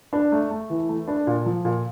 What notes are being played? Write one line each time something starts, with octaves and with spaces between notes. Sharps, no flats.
D4
A3
A3
E3
A3
D4
A#2
F3
A#2